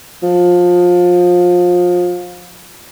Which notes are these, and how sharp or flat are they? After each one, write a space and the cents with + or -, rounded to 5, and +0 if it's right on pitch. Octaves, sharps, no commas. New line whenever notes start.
F3 +25